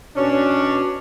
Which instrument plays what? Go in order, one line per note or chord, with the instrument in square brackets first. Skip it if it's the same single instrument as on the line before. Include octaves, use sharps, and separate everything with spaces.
[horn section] B2 C#4 D4